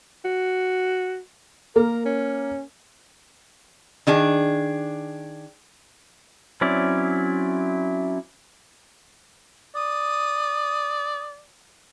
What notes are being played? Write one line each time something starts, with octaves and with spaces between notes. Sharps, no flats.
F#4
A#3 A#4
C#4
D#3 D4 G#4
F#3 C4 C#4 E4 D5
D5 D#6